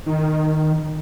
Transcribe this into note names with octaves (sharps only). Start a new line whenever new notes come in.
D#3